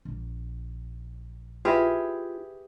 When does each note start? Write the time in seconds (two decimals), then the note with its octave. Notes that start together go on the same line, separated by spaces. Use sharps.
0.05 A#1
1.65 E4 F4 G4 G#4 B4 E5